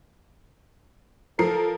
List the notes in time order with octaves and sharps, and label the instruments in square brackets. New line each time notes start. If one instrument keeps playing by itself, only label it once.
[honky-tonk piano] F3 A#4 C7 [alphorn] A4